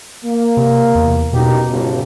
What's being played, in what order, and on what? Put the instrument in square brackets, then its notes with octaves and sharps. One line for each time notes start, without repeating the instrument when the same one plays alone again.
[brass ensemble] A#3
[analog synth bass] C3
E2
[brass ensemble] F#1 D#4 G4 [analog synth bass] B2
[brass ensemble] G1 C#2